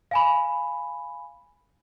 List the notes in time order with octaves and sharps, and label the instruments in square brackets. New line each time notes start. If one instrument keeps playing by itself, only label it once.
[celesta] F5 G#5 B5